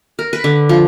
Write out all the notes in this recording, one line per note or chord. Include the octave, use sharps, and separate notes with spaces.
A#4
B4
D3
F3